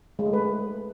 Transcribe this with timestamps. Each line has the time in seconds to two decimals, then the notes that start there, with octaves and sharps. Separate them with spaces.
0.19 G#3
0.26 A3
0.33 B4